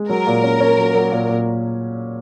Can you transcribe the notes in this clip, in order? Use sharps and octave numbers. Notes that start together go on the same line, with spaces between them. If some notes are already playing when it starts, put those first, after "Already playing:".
Already playing: G#3
F#3 A#4
A#2
C#4
C#4
F#3
F#3
A#2
A#2